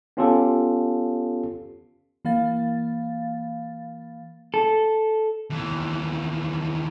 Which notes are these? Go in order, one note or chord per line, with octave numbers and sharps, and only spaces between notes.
B3 C#4 F4 G4 A4
E3 A#3 F5 A6
A4
D#2 E3